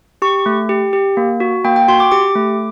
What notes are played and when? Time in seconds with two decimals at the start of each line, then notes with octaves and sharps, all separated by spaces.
0.22 G4 C#6
0.46 A3
0.69 G4
0.93 G4
1.17 A#3
1.40 F#4
1.64 A#3 G5
1.76 G5
1.88 F#4 C6
2.00 D6
2.11 G4 D6
2.36 A3